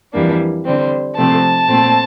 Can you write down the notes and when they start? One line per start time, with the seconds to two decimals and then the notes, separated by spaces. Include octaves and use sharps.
0.13 F2 E3 G3 A#3 D4
0.65 D3 G3 C4
1.16 C3 F3 A3 C4 A5
1.68 A#2 A3 C4